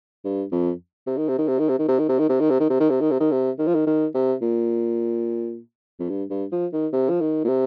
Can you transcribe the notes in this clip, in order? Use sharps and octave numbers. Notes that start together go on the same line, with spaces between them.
G2
F2
C3
D#3
C3
D#3
C3
D#3
C3
D#3
C3
D#3
C3
D#3
C3
D#3
C3
D#3
C3
D#3
C3
D#3
C3
D#3
C3
D#3
F3
D#3
D#3
C3
A#2
F2
G2
G2
F3
D#3
C3
F3
D#3
A#2
C3